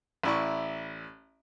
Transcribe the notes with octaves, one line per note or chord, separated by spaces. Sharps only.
A1 E4 D5 C#6